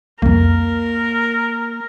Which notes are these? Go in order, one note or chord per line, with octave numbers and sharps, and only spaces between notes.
C2 F2 A#3 A#4